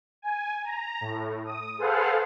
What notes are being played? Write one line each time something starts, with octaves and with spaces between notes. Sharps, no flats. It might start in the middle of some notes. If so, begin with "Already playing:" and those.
G#5
A#5
A2
D#6
G#4 A4 B4 C5 F5 F#5